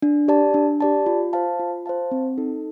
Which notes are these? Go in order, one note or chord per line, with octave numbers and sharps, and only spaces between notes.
D4
G4 D5 A5
D4
G4 D5 A5
F4
C5 F5 A5
F4
C5 F5 A5
C4
D#4 A4